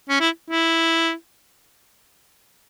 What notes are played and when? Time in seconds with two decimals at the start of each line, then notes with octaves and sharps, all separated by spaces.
0.09 C#4
0.20 E4
0.50 E4